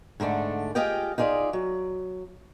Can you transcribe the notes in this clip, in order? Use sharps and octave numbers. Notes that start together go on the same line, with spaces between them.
G#2 D3 A3 D4
F4 G4 G#4 D#5 F5 G5
D#4 F4 G#4 D5 E5
F#3